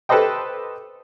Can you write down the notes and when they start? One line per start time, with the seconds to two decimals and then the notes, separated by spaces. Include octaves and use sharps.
0.09 G4 A4 B4 C5 D#5 G5